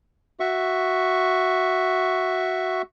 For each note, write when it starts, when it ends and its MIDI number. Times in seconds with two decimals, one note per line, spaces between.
0.40 2.82 66
0.40 2.82 76
0.40 2.82 85